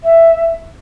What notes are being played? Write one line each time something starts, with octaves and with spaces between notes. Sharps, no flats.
E5